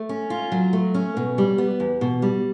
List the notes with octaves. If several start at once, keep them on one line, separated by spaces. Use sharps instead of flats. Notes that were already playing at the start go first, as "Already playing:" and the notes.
Already playing: A3
C#4
F4
F#3
A3
C#4
B2
G3
B3
E2
B2
G3